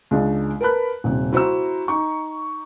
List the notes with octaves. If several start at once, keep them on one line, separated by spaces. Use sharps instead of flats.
C#2 G#3 D4
A#4 B4 A5 B5 F#6
D#1 C3
E4 F#4 C5 A#5 E6
D#4 C#6